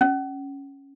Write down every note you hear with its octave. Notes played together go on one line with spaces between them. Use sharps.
C#4